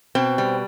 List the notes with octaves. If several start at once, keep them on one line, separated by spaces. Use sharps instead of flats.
B2 C4
G3